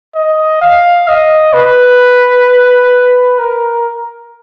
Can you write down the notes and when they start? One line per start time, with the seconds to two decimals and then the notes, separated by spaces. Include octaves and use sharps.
0.15 D#5
0.61 F5
1.08 D#5
1.53 B4
3.38 A#4